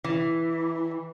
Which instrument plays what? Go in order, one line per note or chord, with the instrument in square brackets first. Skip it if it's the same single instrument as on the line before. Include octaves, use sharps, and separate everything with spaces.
[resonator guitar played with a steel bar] E3